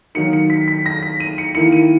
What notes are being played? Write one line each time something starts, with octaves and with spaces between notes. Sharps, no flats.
D#3 F#3 A#3 D#4 C#7
C#7
B6
B6
A#6
B6
D#7
C#7
D#3 A#3 E4 C#7
D#7